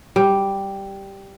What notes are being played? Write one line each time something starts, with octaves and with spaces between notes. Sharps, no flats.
G3